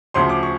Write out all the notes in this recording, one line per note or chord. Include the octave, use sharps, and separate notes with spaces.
D2 C#3 F3 C6
D6
C#6